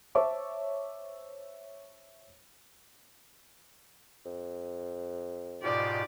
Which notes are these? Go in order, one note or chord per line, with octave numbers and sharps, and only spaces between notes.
C5 C#5 E5 A5 C#6 D6
F2
G#2 B2 F4 G4 D5